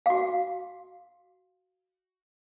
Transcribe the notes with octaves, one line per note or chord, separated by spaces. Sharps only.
F#4 F5